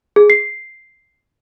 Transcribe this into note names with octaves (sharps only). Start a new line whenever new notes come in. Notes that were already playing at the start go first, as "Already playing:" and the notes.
G#4
C7